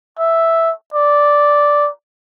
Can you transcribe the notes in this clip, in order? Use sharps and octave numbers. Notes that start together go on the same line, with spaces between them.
E5
D5